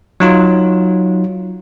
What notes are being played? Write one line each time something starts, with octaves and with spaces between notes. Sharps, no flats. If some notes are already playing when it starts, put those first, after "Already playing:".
F#3 D#4 F4